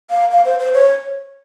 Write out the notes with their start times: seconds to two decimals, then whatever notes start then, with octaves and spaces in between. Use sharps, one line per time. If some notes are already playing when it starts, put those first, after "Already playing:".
0.10 F5
0.31 F5
0.45 C5
0.60 C5
0.74 C#5